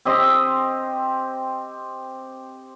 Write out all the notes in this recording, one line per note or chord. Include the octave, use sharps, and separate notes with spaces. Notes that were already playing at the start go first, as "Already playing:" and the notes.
C4 G4 D#5 C6